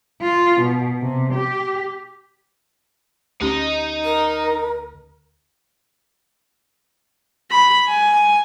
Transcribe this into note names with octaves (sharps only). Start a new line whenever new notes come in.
F4
B2
C3
G4
D2 C#4 D#4 G4
A#4
B5
G#5